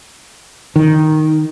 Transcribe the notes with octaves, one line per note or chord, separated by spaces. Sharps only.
D#3